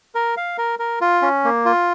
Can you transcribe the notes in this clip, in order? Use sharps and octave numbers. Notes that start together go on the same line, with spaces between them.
A#4
F5
A#4
A#4
F4
C#4
A#3
F4